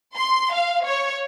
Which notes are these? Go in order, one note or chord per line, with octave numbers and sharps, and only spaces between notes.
C6
F5
C#5